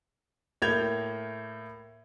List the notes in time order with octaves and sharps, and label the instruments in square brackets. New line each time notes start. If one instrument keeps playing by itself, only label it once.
[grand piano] A2 A#3 G6 G#6 F7